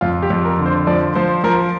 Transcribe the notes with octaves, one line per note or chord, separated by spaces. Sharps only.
F2 F4
G4
F2
A#4
D3
C5
F3 D5
F3 C5
F3 A#4